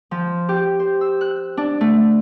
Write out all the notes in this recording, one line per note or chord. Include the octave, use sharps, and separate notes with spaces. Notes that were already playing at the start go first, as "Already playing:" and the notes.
F3
G4
C5
E6
F#6
D4
A3